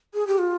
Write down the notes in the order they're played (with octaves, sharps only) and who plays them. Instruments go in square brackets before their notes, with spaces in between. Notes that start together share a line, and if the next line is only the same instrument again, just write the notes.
[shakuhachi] G#4
G4
F4